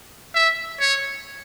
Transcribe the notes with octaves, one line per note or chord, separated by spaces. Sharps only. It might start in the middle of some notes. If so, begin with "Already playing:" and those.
E5
C#5